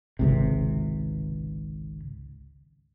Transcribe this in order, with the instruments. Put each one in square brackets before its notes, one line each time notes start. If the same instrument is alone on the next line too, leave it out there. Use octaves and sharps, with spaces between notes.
[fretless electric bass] G#1 C#2 C3